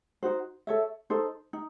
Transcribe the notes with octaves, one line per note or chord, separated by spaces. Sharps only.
D#4 F#4 C5
A4 C#5 E5
D#4 A4 C5
D#4